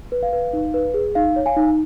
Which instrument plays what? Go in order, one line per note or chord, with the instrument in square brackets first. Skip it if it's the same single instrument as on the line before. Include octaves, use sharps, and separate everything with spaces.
[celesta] B4
F5
B4
D#4
B4
G#4
D#4 F5
C#5
F5 G#5
D#4